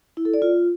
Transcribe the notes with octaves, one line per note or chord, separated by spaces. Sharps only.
E4
A4
D5
F4